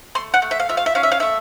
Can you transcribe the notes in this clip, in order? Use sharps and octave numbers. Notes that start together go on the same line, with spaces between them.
A3 C6
F#5
A3
E5
F5
F4 E5
F5
E5
C#4 F5
E5
F5
A3 E5